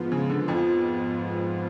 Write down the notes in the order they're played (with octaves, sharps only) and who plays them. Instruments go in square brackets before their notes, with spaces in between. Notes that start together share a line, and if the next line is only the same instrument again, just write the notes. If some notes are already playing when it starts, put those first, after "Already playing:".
Already playing: [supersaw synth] G#2 F3 B3 F4
[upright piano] C#3
D3
F2 F3